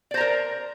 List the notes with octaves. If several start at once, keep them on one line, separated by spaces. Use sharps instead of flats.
A#4 C5 D5 A#5